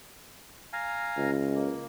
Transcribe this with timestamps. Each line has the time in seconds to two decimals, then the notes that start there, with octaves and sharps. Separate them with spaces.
0.73 F5 G#5 A#5
1.17 C#2
1.55 A#3